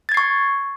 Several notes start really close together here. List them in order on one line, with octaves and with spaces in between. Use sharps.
A6 G#6 C7 C#6